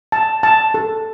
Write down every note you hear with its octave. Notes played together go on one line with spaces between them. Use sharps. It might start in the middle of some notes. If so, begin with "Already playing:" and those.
A5
A5
A4